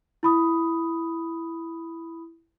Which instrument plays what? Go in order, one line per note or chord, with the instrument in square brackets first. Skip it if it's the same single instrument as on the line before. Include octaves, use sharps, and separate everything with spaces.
[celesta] E4 B5 D#6